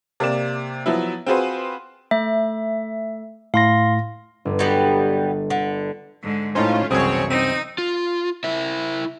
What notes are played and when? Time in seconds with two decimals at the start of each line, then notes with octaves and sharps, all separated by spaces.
0.20 C3 A#3 D5 E7
0.86 F3 F#3 B3 E4
1.27 C4 F4 F#4 G#4 B4 C5
2.11 A3 E5
3.54 A2 F5 C6 A#6
4.45 G1
4.59 F#3 G3 B3
5.50 D3
6.22 G#2 D3
6.55 A2 A3 C#4 D#4 F4 C5
6.91 C2 F#2 B2 E3 C4 G#4 C#5
7.30 C4 D#4 D#7
7.78 F4
8.44 E4 A#4 E5